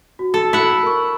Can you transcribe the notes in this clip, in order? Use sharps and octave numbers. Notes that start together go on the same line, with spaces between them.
F#4
A4
E4 F#5
A#4 C#6